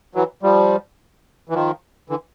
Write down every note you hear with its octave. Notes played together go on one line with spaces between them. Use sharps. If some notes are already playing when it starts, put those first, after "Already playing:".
E3 F#3
F3 G3
E3
D#3 F3
D3 E3